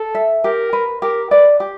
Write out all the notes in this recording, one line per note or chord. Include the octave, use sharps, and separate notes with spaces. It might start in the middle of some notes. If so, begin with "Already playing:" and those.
Already playing: A4
E5
G4 A#4
B4
G4 A#4
B4 D5
G4